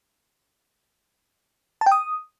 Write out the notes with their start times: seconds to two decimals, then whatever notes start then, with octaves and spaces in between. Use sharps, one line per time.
1.81 A5
1.86 G5
1.92 D#6